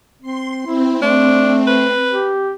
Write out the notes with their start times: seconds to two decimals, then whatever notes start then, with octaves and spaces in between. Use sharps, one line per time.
0.22 C4 C6
0.66 C4 E4
1.02 A3 D4
1.67 B4
2.10 G4